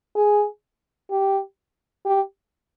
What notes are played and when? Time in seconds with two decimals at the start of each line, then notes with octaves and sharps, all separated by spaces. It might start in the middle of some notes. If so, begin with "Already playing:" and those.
0.16 G#4
1.11 G4
2.06 G4